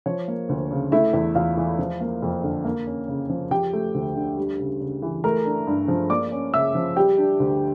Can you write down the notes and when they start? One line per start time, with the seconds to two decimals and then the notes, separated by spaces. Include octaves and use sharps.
0.06 F3 C#5
0.28 A#3
0.49 D2
0.71 C#3
0.92 A3 E4 E5
1.13 E2
1.35 E2 F4 F5
1.57 E3
1.79 F3
2.01 A#3
2.22 F2
2.43 D3
2.65 A#3
2.87 C#4
3.08 C#3
3.29 F3
3.51 F3 G4 G5
3.73 A3
3.94 D2
4.16 D3
4.37 G3
4.59 C#3
4.81 C#3
5.02 E3
5.24 A3 A#4 A#5
5.45 D4
5.67 G2
5.88 F3
6.10 A#3 D5 D6
6.32 C#4
6.54 C#3 E5 E6
6.75 F3
6.96 G3 G4 G5
7.18 D4
7.40 D2